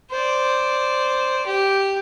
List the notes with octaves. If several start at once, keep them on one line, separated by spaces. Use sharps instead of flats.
C5 D5
G4